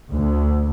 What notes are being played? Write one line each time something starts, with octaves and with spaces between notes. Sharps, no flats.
D2